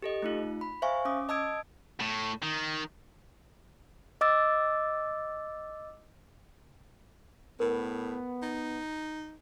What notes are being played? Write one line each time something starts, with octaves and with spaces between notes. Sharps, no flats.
G4 A4 D#5
A3 D#4 F4
B5
C5 E5 F5 G#5 C#6
C#4 D6 D#6
D#5 A5 D#6 E6 G#6 D7
A2
D#3
D#5 D6 E6 A6
A2 B3 A#4
D#4